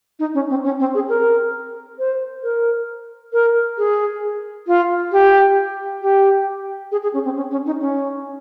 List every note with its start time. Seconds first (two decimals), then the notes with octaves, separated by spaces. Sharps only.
0.19 D#4
0.34 C#4
0.50 C4
0.64 C#4
0.80 C4
0.95 G#4
1.09 A#4
1.99 C5
2.43 A#4
3.33 A#4
3.78 G#4
4.67 F4
5.12 G4
6.02 G4
6.92 G#4
7.03 G#4
7.13 C#4
7.25 C4
7.36 C#4
7.51 C#4
7.66 D#4
7.81 C#4